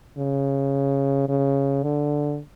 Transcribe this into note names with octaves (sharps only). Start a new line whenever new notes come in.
C#3
C#3
D3